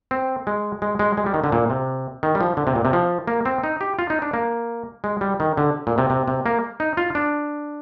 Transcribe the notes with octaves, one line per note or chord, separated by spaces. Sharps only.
C4
G#3
G#3
G#3
G#3
G3
D#3
D3
A#2
C3
D#3
G3
F3
D3
C3
A#2
C3
F3
A#3
C4
D#4
G4
F4
D#4
D4
A#3
G#3
G3
D#3
D3
A#2
C3
C3
C3
A#3
D#4
F4
D4